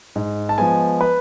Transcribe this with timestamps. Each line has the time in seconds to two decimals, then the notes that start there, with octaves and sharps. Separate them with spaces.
0.16 G#2
0.49 A5
0.58 F3 G#3 B3 G#5
1.01 B4